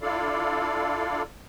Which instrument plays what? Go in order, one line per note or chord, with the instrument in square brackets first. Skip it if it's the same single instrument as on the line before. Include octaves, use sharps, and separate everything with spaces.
[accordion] D4 E4 F4 A4 D5 F5